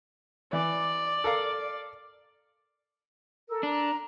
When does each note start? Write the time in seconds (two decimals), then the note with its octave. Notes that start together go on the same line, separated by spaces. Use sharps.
0.53 E3 D5
1.24 A4 A#4 F5
3.50 A4 A#4 E6
3.63 D4 A#5